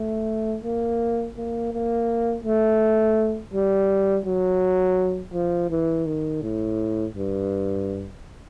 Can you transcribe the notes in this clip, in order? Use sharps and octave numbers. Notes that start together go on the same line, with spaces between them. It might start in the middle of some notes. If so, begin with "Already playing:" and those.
Already playing: A3
A#3
A#3
A#3
A3
G3
F#3
F3
E3
D#3
A2
G2